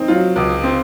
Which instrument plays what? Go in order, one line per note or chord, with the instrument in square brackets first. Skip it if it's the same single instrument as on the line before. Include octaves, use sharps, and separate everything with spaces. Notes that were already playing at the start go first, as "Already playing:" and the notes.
Already playing: [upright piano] C4 D#4
[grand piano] F#3 [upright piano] F4
[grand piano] C#2
C4